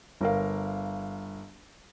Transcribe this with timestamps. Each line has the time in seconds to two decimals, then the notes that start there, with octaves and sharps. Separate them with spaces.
0.21 G1 A#4 F5